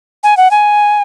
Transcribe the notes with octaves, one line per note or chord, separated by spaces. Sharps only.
G#5
F#5
G#5